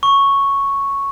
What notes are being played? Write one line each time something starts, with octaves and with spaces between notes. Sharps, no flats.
C#6